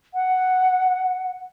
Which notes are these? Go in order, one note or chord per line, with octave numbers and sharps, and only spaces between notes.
F#5